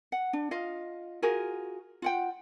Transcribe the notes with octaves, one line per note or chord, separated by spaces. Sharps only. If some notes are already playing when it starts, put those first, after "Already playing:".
F#5
D4
F4 D#5 F5
F4 F#4 G#4 A#4
F4 F#5 G5